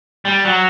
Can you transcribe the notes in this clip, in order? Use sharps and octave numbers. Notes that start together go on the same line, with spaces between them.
G3
F#3